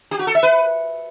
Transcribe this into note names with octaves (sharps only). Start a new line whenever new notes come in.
G4
F#4
A4
E5
B4